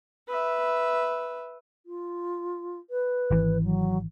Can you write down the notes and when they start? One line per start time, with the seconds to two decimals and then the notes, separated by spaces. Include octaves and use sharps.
0.28 B4 E5
1.86 F4
2.90 B4
3.31 G#1 E3
3.63 F#3